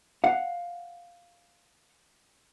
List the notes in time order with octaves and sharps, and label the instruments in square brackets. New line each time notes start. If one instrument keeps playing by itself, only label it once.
[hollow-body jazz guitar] F5 F#5